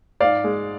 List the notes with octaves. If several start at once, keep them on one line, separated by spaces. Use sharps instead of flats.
G#2 D5 F5
G#3